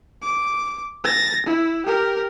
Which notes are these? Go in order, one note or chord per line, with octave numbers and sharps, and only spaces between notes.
D6
A6 A#6
E4
G4 A#4